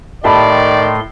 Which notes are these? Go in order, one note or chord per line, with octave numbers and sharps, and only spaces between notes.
A2 D#3 A3 G4 D5 A5 B5 C6